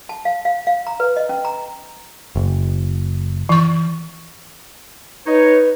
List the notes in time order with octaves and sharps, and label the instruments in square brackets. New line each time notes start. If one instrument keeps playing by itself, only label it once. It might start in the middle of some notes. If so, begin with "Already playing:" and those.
[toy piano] A5
F5
F5
F5
A#5
B4
D#5
C#4
A#5
[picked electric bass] F#1
[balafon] E3 C#6
[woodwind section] D#4 C#5 [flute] B4